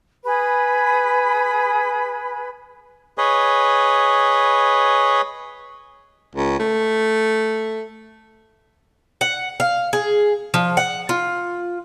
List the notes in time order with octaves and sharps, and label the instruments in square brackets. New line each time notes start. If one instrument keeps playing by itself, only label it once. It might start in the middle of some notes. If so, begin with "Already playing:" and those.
[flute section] G#4 B4 B5
[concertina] G#4 B4 C#5 D#5
[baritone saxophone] C#2
A3
[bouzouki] F#5
F5
G#4
F3
F#5
F4